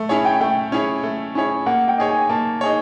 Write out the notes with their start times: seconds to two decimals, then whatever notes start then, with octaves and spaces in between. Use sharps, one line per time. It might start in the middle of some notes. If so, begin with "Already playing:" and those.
Already playing: A3
0.09 C#4 E4 G#4 C#5
0.25 G5
0.41 A3 G5
0.72 C#4 E4 G#4 C#5
1.03 A3
1.35 C#4 E4 G#4 C#5
1.66 A#3 F#5
1.88 G5
1.98 D#4 G#4 C#5
2.09 G#5
2.29 A#3 A5
2.61 D#4 G#4 C#5